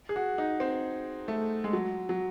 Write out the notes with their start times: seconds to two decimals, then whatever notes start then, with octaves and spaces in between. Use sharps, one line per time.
0.09 G#4
0.16 F#4
0.38 D#4
0.60 C4
1.28 A3
1.64 G#3
1.73 F#3
2.09 F#3